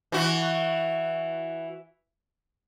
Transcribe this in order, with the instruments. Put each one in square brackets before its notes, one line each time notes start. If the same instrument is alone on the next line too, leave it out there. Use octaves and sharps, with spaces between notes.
[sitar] E3 F#4